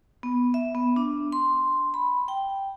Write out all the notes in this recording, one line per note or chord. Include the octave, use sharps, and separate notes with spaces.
B3
E5
B3
D4
C6
B5
G5